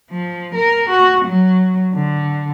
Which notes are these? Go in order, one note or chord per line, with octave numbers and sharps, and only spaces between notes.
F3
A#4
F#4
F#3
D3